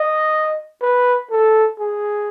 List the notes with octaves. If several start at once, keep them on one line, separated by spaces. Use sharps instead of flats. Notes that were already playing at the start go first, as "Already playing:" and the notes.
Already playing: D#5
B4
A4
G#4